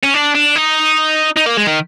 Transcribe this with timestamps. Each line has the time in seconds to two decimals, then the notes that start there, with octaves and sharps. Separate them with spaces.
0.03 C#4
0.14 D4
0.35 D4
0.55 D#4
1.37 D#4
1.46 A#3
1.57 G#3
1.67 D#3